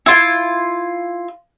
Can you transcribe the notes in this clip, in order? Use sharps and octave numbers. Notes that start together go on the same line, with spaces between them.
E4 F4